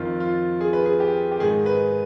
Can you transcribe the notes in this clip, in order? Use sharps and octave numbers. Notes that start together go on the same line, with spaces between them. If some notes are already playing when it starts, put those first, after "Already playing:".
Already playing: F2 D#3 F4
F4
G#4
B4
G#4
G4
G4
G#2 D#3 G#4
B4